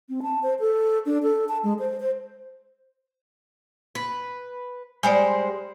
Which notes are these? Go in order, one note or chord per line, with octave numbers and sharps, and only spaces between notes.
C4
A5
C5
A4
D4
A4
A5
G#3
C5
C5
B4
G3 G#3 C5 D5 G#5